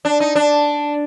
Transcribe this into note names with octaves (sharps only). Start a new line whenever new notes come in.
D4
D#4
D4